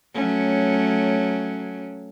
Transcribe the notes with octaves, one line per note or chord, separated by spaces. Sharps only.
F#3 A3 C#4